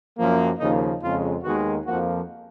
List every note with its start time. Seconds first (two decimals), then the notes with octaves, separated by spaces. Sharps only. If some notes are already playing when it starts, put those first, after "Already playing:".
0.18 F#2 F3 A#3
0.59 D#2 C#3 F3 A#3 D#4
1.01 F2 C#3 G#3 F4
1.43 D#2 D#3 G#3 B3 F#4
1.86 F2 F3 A#3 F#4